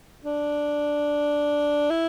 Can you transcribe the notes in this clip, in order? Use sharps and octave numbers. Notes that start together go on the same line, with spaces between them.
D4
E4